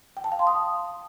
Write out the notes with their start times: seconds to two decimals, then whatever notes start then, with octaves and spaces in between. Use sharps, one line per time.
0.17 G5
0.24 A5
0.32 F5
0.39 C6
0.47 D#6